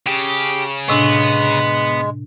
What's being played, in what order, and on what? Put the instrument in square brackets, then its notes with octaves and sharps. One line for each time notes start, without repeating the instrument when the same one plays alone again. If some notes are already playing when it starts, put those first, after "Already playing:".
[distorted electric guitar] C#3 [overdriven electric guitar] G4
[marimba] A2 C3 D4 [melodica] G#3 [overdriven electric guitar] B3